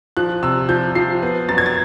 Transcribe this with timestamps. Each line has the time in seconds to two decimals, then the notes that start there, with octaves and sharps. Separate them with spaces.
0.17 F3 F#6
0.43 C3 E6
0.69 F3 G6
0.95 F3 C7
1.23 B3
1.48 F#2 A6
1.58 G#6
1.66 A6